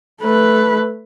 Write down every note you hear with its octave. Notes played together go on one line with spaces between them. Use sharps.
A3 B4